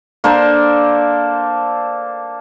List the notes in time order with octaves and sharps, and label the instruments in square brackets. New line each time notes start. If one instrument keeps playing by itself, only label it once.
[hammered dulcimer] A#3 D4 A4 C5